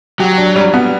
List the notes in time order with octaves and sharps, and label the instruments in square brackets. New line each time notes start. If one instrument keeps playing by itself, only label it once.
[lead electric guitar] F#3 [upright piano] G4
[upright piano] D4
G3
B3